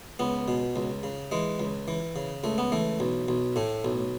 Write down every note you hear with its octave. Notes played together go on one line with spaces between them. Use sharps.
C#2 B3
B2
C#2
C#3
E3 G#3
C#2
E3
C#3
C#2 A3
B3
E3 A3
B1
B1
A2 A3
B1